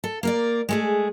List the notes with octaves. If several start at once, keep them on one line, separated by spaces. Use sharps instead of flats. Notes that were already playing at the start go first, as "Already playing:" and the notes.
A4
A#3 A#4 D5
G#3 A3 G#4